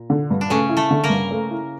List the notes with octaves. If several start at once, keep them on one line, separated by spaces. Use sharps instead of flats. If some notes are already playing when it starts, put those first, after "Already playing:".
Already playing: A#2
D3
G2
D4
C#3 A3 C#4
E4
A3 A4
D3
A#3 A#4
G2
A3
E4